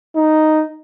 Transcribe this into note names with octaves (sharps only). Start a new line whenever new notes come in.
D#4